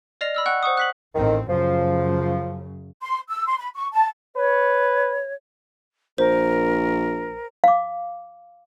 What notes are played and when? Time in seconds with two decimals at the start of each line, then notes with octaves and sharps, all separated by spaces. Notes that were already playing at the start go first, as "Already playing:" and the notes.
0.21 D5 D#5 F6 A#6 C7 F7
0.35 B5 E6 F6
0.46 F#5 G5 C#6 F#6
0.63 C5 F#5 C#6 D#6
0.77 F#6 B6 F#7
1.15 A1 D#3 C4
1.49 F#2 C#3 F3
3.01 C6
3.29 E6
3.47 C6
3.58 B5
3.75 C#6
3.92 A5
4.36 B4 C#5
6.18 A#1 A#4 C5
7.64 F5 D6